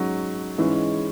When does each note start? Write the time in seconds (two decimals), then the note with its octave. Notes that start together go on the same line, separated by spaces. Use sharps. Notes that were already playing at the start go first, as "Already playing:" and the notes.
Already playing: G#2 F#3 C#4
0.58 G#2 E3 G#3 C#4